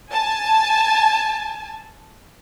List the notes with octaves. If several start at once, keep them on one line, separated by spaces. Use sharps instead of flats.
G#5 A5